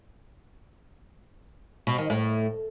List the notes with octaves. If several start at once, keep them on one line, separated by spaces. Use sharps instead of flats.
B2
D#3
A2